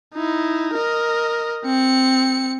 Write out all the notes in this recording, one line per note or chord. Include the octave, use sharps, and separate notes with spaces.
D#4 E4
A#4 D#5
C4 C#7